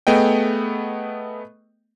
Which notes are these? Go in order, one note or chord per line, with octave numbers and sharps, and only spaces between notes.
A3 B3 G#4 D#5 G5